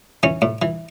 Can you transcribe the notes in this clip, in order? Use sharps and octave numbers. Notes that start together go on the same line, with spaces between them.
E3 C#4
A2
E3